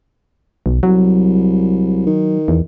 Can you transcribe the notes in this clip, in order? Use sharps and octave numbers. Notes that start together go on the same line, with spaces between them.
B1
C2 F#3
D#3
E2